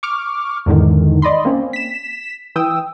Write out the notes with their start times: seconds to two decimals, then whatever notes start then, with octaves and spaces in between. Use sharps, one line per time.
0.03 C#6 D6 F6
0.66 E2 G#2 D3 D#3
1.22 D5 D#5 B5 C6
1.45 A#3 C4 C#4
1.73 B6 E7
2.56 E3 G5 D#6 E6